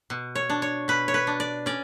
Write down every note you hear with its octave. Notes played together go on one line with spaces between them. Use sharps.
B2
C#5
D4
C#5
B2 B4
C#5
B4
D4
D5
C#4 D5